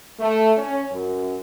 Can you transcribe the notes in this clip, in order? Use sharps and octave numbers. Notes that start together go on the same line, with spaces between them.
A3
C#4
F#2